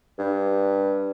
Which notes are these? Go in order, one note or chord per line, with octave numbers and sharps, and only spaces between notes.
G2